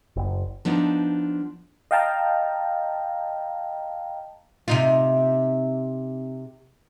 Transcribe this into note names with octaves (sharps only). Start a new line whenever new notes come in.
F#1
F3 B3 D4 D#4
D#5 F5 G5 A5 A#5
C3 D#4 F4